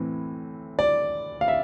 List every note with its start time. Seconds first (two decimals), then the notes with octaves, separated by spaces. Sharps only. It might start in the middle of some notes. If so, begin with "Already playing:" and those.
Already playing: A2 E3 C4
0.79 D5
1.41 F5
1.48 E5